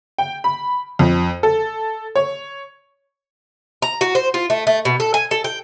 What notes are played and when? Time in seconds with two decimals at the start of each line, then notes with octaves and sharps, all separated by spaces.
0.18 G5
0.44 B5
0.99 F2
1.43 A4
2.16 C#5
3.82 A#5
4.01 F#4
4.15 C5
4.34 F4
4.50 A3
4.67 A3
4.85 B2
5.00 A4
5.14 G#5
5.31 A4
5.44 G5